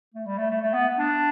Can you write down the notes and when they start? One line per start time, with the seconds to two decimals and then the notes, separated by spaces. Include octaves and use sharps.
0.14 A3
0.26 G3
0.38 A3
0.50 A3
0.62 A3
0.73 B3
0.98 D4